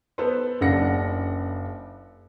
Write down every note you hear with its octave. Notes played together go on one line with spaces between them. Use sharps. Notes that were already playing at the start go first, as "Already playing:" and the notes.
B3 A4 B4 C5
F#1 C#3 D4 F#5 A#6 C#7